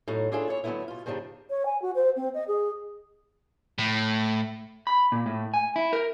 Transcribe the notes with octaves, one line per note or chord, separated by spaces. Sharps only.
A2 F#3 D#4
D4 E4 F4 G#4 A4 C#5
E4 C#5
D3 F#3 G#3 A3 B3 E4
B2 F4
G2 C#3 F3 D4 D#4
C#5
G#5
F#4
C5
C4
D#5
G#4
A2
B5
A#2
A2
G#5
E4
A#4